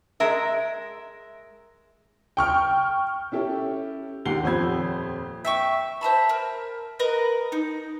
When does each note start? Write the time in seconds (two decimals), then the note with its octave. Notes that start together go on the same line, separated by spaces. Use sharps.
0.20 G#3 A#4 E5
2.37 G5 C#6 F6
3.32 C#4 E4 G4 A4
4.25 D#2 G#2 G4 F#5 C7 G7
4.43 D#1 F2 C5 B5 E6 G#6
5.45 E5 G5 C#6
6.01 C5 E5 A5 B5
6.29 A#4
6.99 A#4 B4 D#5
7.52 D#4